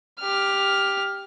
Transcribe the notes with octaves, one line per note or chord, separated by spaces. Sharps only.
G4 F6